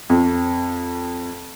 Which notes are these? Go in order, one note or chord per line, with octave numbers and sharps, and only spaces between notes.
F2